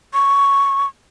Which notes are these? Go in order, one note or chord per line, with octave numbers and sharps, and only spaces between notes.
C#6